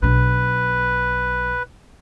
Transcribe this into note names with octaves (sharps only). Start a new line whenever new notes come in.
B1 D4 B4